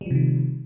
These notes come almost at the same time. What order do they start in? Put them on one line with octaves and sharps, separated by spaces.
G3 F3 C3 D#3